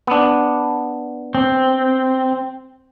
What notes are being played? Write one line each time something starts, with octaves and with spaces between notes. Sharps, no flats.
B3 D4
C4